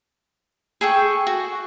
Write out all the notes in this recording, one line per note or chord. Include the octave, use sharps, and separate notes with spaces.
G#4 A4 G5 C#6
F#4